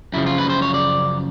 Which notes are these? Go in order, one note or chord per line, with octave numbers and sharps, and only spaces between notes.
F#2 C#3 F3 E4
F4
B4
C5
C#5
D5